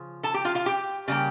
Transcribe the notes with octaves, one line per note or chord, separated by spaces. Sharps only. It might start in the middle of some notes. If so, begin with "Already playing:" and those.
Already playing: C#3 F3
A4 A5
G4 G5
F4 F5
F4 F5
G4 G5
C#3 G3 A#3